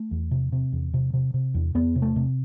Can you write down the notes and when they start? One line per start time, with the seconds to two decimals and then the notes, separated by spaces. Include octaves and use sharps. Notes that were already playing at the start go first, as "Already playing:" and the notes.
Already playing: A3
0.11 E2
0.31 C3
0.52 C3
0.73 E2
0.94 C3
1.14 C3
1.34 C3
1.54 E2
1.75 E2 B3
1.96 C3
2.02 A3
2.16 C3